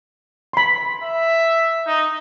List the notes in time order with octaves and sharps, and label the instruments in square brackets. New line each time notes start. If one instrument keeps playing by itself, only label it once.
[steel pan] B5 C6
[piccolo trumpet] E5
D#4